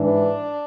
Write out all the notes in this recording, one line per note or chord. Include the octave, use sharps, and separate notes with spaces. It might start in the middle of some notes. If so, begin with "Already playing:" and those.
Already playing: G#2 E3 D4